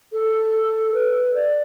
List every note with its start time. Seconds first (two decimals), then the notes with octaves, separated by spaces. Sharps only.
0.12 A4
0.93 B4
1.34 D5